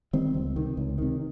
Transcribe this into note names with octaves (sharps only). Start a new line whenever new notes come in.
D#3 G3 C4
C#2
C3 D#3
C#2
C3 D#3